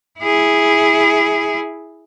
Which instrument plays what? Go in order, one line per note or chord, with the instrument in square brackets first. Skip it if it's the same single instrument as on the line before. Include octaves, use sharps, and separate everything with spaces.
[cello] E4 G#4